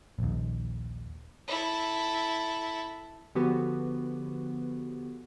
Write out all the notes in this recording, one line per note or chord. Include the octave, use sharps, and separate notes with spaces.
A#1 D#2
E4 A4
D3 F3 B3 F#4 G4 B4